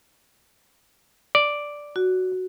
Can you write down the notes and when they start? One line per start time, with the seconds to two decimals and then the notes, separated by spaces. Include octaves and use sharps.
1.35 D5
1.96 F#4